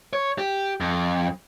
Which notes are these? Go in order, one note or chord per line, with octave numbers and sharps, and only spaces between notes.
C#5
G4
F2